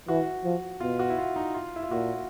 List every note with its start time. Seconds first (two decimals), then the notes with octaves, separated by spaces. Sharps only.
0.08 E3 F#4
0.44 F3
0.80 B2 F4
0.99 F#4
1.10 E4
1.18 F4
1.36 D#4
1.54 F4
1.76 E4
1.83 F4
1.91 A#2 F#4